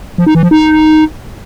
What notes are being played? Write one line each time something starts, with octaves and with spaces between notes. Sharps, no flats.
F3
D#4
E3
F3
D#4